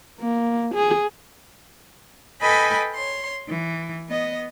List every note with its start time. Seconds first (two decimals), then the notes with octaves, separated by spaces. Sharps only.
0.20 A#3
0.74 G#4
2.41 A4 B4 D#5 G5 G#5 B5
2.94 C#5 C6
3.49 E3
4.08 B3 D#5